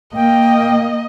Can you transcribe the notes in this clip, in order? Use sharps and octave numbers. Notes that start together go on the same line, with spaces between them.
A#3 D#5 G5